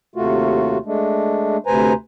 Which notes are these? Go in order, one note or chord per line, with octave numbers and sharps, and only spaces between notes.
D#2 C3 A3 F4 F#4
G#3 A3 D4
D2 C3 B4 C5 G#5 A#5